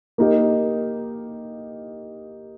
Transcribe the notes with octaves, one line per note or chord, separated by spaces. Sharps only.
A#3 D#4 G4 A#4 D#5